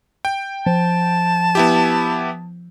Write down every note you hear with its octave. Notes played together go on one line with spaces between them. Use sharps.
G5
F3 A5
B3 E4 G4